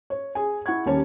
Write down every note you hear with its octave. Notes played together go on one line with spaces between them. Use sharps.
C#5
G#4 G#5
E4 F#5 C#6 G#6
D#2 G3 C#4 C#5 A5